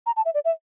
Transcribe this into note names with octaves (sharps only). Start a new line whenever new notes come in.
A#5
A5
E5
D5
E5